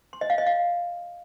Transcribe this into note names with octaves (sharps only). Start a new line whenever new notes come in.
C6
D#5
F5
D#5
F5